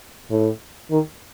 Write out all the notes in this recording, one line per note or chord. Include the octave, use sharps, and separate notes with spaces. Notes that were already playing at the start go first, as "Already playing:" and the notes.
A2
D#3